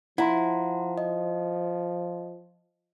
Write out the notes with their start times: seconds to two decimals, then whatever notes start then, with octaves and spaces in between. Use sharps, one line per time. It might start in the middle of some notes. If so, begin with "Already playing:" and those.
0.18 F3 E4 F#5 A#5 C6
0.98 D#5